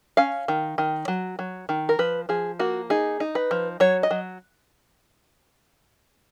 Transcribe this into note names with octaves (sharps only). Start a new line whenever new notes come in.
C#4 F5
D#3
D#3
F#3
F#3
D#3
A#4
F3 B4
F3 G#4
A#3 F#4
D#4 G#4
D#4
B4
F3
F#3 C#5
D#5
F#3